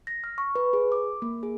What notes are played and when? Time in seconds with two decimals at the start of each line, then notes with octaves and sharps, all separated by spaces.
0.07 A#6
0.24 F6
0.38 C#6
0.55 B4
0.73 G#4
0.92 D6
1.22 A#3
1.43 G#4